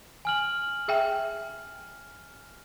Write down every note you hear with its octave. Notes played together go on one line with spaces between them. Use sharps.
G#5 F6 F#7
G#4 E5 G5